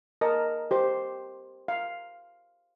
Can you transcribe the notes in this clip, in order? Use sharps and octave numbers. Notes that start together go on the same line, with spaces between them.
A#4 D#5 A5
G4 C5 D5
F5